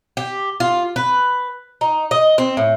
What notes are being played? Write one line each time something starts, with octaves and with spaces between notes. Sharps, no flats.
G4
F4
B4
D#4
D#5
C4
A2